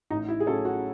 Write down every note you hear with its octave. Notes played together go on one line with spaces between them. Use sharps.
A1 D#4
E4
G#4
A2 F#3 C#4 A4
F#4